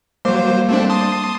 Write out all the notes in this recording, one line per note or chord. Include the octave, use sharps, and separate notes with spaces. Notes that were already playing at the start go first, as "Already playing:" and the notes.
F#3 G3 A#3 C5 D6
A3 C4 D4
A5 C6 D#6